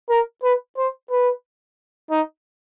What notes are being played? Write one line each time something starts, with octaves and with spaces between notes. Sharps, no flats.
A#4
B4
C5
B4
D#4